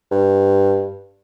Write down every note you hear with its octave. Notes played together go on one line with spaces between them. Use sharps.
G2